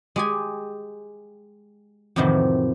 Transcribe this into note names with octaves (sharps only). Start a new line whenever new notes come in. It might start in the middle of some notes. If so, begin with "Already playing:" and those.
G#3 G4 G#5
F2 A2 C3 D#3 E3 F#3